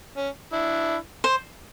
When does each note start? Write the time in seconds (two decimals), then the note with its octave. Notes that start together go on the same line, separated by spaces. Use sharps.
0.17 C#4
0.53 D4 E4
1.24 C5